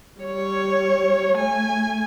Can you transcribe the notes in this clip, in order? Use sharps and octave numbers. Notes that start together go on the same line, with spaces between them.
G3 C#5
A3 G#5